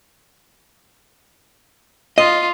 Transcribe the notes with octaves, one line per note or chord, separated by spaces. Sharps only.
F4 D#5